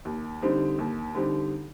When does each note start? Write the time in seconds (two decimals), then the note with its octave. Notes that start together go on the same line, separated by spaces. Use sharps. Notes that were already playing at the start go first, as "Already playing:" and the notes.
0.05 D#2
0.42 D3 G3 C4 D#4
0.79 D#2
1.14 D3 G3 C4 D#4